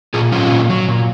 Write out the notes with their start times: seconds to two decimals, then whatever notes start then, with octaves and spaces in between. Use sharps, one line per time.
0.14 A#2 F4 G#4
0.32 F#3 C#4 F4
0.51 A#2
0.70 F#3
0.88 A#2